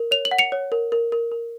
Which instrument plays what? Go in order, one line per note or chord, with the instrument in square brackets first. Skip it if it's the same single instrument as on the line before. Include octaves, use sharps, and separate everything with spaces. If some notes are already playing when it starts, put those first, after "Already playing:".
Already playing: [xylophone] A#4
C#5 F7
F#7
F#5
C#7 F7
C#5
A#4
A#4
A#4
A#4